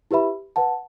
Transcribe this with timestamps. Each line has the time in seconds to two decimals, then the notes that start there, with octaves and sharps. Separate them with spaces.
0.11 E4 G4 B4 E5 B5
0.56 B4 F#5 A5